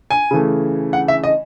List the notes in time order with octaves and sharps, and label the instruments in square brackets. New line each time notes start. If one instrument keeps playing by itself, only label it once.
[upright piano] G#5
C#3 E3 A3
F#5
E5
D#5